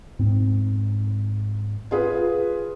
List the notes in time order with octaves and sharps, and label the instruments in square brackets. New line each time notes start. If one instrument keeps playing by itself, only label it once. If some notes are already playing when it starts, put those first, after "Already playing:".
[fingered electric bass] G#2 C4
[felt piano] F4 G#4 B4